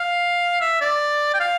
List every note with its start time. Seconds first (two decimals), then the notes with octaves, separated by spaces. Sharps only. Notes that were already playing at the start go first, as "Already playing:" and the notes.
Already playing: F5
0.61 E5
0.81 D5
1.34 G5
1.40 F5